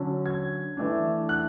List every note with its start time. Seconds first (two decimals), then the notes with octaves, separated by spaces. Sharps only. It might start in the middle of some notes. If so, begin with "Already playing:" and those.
Already playing: D3 F#3 C#4
0.26 G#6
0.77 E3 A3 D4
1.29 F#6